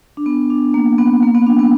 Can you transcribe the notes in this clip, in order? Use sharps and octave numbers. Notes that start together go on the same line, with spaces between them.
D4
B3
D4
A#3
B3
A#3
B3
D4
B3